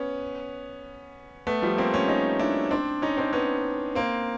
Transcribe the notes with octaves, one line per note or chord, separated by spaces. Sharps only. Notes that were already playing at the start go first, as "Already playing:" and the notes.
Already playing: B3 C#4
A3 B3
F3 G3
A#3 C4
B3 C#4
C#4 D#4
D4 E4
C4 D4
C#4 D#4
C4 D4
B3 C#4
A#3 C4